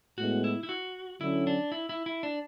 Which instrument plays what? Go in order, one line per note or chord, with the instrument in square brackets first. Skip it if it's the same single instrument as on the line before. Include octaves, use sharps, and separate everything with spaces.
[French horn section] A2 G#3 B3 [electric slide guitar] F#4
[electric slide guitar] E4
E4
F#4
[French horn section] D3 F#3 C#4 [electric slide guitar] E4
[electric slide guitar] D4
E4
E4
E4
D4